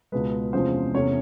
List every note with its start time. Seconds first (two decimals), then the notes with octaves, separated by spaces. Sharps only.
0.12 C#2 B2 G#3 B4
0.53 E2 C3 F3 G#3 C#4 C5
0.94 E2 C3 E3 A3 C#4 C#5